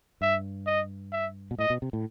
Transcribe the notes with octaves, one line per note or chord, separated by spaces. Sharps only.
G2 E5
D#5
E5
B2
A2 D#5
B2
C3
A2